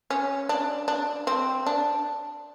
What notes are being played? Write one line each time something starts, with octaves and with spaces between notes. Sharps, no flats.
C#4
D4
D4
C4
D4